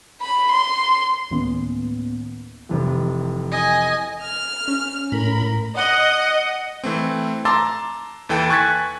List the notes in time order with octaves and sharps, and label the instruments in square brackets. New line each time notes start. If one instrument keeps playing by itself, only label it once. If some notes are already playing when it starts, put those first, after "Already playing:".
[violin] B5
C6
[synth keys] D2 A2 D#3 A#3 B3 C#4
[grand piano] F1 C3 E3
[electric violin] D#5 G#5
[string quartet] F6
[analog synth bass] C#4
[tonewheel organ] A2 B5 [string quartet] A#4
[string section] D#5 [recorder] F#5
[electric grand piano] E3 A3 C4
A5 A#5 C6 D6 E6 A6
D#2 E3 A4 G5
G#5 C#6 F#6 G#6 A6 B6